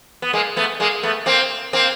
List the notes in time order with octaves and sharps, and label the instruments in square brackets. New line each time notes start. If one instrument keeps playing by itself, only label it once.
[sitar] B3
G#3 A#3
A3 B3
G#3 A#3
A3 B3
A#3 C4
A#3 C4